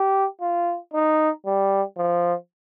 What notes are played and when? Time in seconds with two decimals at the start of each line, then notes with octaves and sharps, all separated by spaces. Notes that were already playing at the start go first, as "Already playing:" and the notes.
Already playing: G4
0.41 F4
0.94 D#4
1.46 G3
1.97 F3